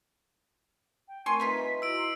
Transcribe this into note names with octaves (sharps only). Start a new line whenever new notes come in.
G5
A3 C4 A#4 C#5 G#5 C6 D#7
G3 D#4 F4 B4 D#5 E5 B6
E4 F#4 D#5 A#5 E6 D7
C6